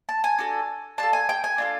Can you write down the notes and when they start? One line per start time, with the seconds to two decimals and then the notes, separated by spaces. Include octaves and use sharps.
0.09 A5
0.24 G#5
0.39 D4 F#4 A4
0.98 D4 F4 A4 A5
1.13 G#5
1.29 G5
1.44 G#5
1.58 D4 F4 A4